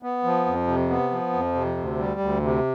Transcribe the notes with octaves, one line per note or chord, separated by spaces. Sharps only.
B3
F3
F2
C3
B3
F3
F2
C3
D2
G3
D2
C3